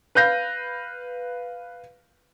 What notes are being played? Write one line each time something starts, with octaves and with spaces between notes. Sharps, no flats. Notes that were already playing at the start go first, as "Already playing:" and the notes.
B4 F5 G6 A#6